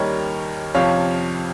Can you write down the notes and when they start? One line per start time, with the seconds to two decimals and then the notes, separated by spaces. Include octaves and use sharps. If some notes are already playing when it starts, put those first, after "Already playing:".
Already playing: D#2 D#3 G3 A#4 C#5
0.74 F2 C3 F3 C#5 F5